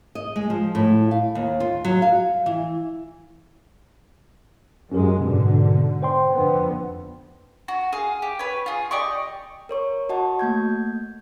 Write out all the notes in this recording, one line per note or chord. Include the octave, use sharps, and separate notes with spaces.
D#5
G#3
F3
A2
F5
D#2
F4
F#3
F5
E3
F#2 G#3 C#4 G4 A#4
G#2 B2 D3 B3
C5 G5 C6
F2 D3 B3
F#4
G#4 F5
G4
B4 C#5
F4 G#4
G4 D5 D#5 C#6
A#4 C#5 C#6
F#4 D#5 F#5 A5 C#6
A3 A#3 G6 G#6